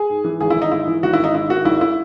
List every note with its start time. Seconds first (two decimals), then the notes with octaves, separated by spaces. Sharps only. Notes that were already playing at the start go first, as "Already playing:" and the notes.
Already playing: G#4
0.10 G#2
0.24 E3
0.41 G#1 G#4
0.50 E4
0.56 G#1
0.62 D#4
0.71 G#2 E4
0.87 E3
1.03 G#1 F#4
1.13 E4
1.19 G#1 D#4
1.34 G#2 E4
1.49 D#3 F#4
1.65 G#1 E4
1.81 E4